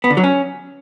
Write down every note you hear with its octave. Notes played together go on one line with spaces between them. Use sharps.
B3
D3
F#3
C#4